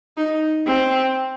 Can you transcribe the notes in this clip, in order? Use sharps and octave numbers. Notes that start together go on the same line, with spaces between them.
D#4
C4